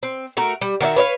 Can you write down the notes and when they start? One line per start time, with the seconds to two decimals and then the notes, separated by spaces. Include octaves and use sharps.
0.03 C4
0.37 A3 F#4 A#4
0.61 G3
0.81 D#3 F#4 D5 E5
0.96 B4 C#5 D#5 F5